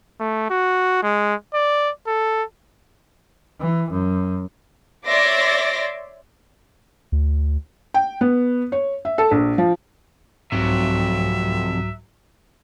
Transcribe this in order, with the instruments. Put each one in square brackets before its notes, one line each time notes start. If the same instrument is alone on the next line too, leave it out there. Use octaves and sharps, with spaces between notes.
[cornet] A3
F#4
G#3
D5
A4
[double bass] E3
F#2
[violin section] C#5 D5 E5 C6 D6 A#6
[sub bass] D2
[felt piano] G5
B3
C#5
E5
A4
A#1
F3
[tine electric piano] C2 G#2 [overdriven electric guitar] F2 C3 [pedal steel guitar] F#3 [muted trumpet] E5